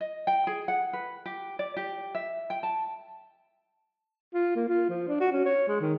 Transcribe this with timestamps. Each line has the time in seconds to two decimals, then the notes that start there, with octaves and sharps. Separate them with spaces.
0.01 D#5
0.27 G5
0.47 G#4
0.68 F#5
0.93 B4
1.26 G4
1.59 D5
1.77 G4
2.15 E5
2.50 G5
2.63 A5
4.34 F4
4.56 A#3
4.69 F4
4.89 F3
5.08 D4
5.20 F#4
5.32 C#4
5.45 C#5
5.68 G#3
5.81 D#3